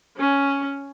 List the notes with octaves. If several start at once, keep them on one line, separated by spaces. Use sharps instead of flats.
C#4